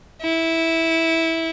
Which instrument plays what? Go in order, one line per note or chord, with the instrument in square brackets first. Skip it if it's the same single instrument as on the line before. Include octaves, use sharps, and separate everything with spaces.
[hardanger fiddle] E4